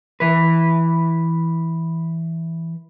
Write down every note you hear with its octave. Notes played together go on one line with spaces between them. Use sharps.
E3 B4